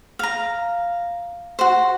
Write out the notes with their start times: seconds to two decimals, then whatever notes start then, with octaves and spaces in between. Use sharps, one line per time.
0.19 F5 A#5
1.59 F#4 C5